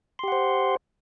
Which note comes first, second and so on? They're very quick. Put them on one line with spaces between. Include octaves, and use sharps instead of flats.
C6 G4 F#5 C5